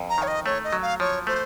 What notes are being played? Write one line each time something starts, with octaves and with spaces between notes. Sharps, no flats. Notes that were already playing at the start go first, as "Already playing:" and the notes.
Already playing: F2
A#5
D#3 C#5
D#5
A3 C#5
D#5
F#3
F5
F3 C#5
A3 C5